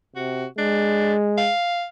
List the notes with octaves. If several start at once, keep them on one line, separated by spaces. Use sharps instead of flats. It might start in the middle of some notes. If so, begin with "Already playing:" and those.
C3 F#4
G#3 D4
F5